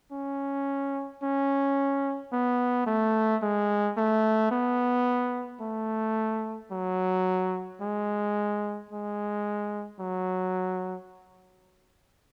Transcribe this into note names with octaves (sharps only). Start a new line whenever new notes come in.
C#4
C#4
B3
A3
G#3
A3
B3
A3
F#3
G#3
G#3
F#3